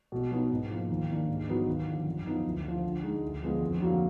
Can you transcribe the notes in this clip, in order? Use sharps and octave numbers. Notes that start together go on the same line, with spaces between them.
B2
F#3 B3 D#4
G#2
F3 A#3
D#2
D#3 A#3 D4
G#2
F#3 B3 D#4
D#2
D3 F3
F#2
F3 B3 D#4
D2
D3 F3
D3
G#3 D#4
D2
D3 F3 G#3 B3
F2
D3 F#3 A#3